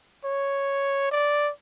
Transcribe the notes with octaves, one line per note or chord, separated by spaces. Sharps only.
C#5
D5